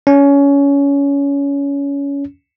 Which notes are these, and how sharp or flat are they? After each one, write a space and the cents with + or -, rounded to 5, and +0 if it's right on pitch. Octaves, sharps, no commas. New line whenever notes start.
C#4 +20